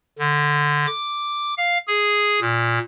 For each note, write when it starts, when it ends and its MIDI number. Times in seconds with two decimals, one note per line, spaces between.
0.19 0.86 50
0.87 1.54 86
1.57 1.78 77
1.88 2.40 68
2.41 2.79 46